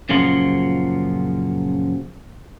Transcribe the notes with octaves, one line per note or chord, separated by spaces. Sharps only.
F#2 A#2 C#3 F3 F#3 F4